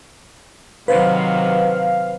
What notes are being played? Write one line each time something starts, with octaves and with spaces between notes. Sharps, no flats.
C3 D#3 F#3 B4 C5 F5